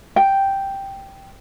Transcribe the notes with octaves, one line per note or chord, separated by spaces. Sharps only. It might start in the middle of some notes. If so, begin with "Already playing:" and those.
G5